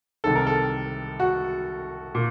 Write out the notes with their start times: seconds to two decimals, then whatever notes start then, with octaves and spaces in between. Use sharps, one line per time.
0.24 C2 C3 D#3 A4
0.35 A#4
0.47 A4
1.20 F#4
2.15 A#2